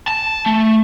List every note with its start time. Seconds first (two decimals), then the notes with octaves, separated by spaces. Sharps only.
0.08 A5
0.46 A3